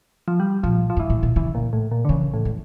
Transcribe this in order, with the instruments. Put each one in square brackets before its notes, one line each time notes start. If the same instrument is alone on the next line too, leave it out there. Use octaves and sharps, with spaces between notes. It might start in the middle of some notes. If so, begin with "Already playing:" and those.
[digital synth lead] F3
G3
[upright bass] A#2 [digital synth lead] F3
[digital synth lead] F3
[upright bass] G2 [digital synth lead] E3
[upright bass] A2
A#2
[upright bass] C#3 [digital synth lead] E3
[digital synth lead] A#2
A2
A#2
D3
[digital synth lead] C#3 [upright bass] E3
[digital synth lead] A2
[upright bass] E3